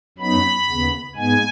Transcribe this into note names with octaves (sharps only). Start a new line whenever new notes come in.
F#2 F#3 B3 D#4 B5
D#2 C#3 B3
G#2 G#3 B3 G#5